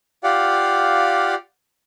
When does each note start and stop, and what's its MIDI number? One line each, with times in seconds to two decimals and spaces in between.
0.24 1.35 65
0.24 1.35 67
0.24 1.35 74
0.24 1.35 77
0.24 1.35 78